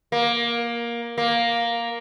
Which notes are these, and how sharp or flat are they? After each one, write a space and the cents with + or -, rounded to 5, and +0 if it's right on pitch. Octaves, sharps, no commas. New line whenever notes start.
A#3 +15
A#3 +5